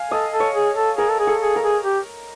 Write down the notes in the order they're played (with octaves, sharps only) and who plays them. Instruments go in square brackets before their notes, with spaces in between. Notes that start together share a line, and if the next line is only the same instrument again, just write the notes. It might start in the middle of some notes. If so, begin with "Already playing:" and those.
Already playing: [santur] F5 G#5
[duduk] A4 [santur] D#5
[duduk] A4
[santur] C#5
[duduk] G#4
A4
[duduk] G#4 [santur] A#4
[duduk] A4
G#4
[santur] A4
[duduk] G#4
[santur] A#4
[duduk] G#4
G4